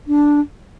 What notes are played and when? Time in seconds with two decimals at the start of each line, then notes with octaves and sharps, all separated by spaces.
0.07 D4